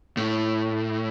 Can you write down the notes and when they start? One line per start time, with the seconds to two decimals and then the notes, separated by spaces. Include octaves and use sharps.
0.17 A2